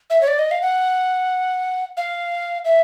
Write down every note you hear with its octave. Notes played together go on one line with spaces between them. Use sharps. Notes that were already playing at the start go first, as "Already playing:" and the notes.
E5
C#5
D5
D#5
F5
F#5
F5
E5